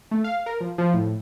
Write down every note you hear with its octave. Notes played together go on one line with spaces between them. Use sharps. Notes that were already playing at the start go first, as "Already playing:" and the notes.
A3
F5
A#4
F3
F3
A2